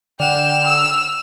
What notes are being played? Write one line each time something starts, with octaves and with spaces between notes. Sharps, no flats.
D3 D5 F#5 G5 F6 E7
E6